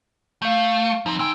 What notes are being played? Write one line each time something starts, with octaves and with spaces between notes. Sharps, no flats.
A3 F5 G6
F3 C4 D#4
E2 G5 G#5 C6 E6